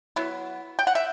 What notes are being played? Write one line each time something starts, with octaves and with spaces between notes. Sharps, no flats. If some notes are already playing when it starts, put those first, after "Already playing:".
F#3 B3 E4
G5
F#5
E5